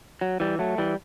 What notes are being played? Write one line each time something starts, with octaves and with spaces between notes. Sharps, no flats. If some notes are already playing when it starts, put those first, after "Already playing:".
F#3
E3 G3
F#3 A3
E3 G3